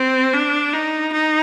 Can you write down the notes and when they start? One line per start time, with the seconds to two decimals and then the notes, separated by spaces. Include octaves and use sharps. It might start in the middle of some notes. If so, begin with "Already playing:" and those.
Already playing: C4
0.34 D4
0.74 D#4
1.13 D#4